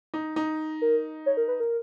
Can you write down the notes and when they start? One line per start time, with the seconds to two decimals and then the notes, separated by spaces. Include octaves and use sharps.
0.14 D#4
0.36 D#4
0.82 A#4
1.26 C#5
1.37 A#4
1.48 B4
1.60 A#4